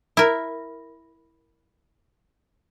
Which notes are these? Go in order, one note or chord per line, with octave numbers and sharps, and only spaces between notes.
E4 A#4